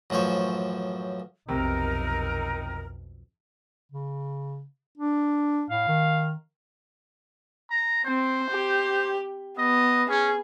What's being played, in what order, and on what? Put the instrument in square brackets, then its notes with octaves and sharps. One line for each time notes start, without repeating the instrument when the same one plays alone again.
[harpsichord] A1 F#2 F3 C5 C#5
[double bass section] B1 F2 [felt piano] C3 [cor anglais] D#4 [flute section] A#4
[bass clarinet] C#3
D4
[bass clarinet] A2 [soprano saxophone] F5
[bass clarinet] D#3
[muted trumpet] A#5
[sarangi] C4 [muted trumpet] C5
[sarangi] G4
[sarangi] B3 [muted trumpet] D#5
[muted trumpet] C#4 [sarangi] G#4